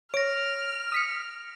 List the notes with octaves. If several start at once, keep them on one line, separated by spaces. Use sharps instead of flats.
C#5 F6 A#6 D7
D#6 B6 C#7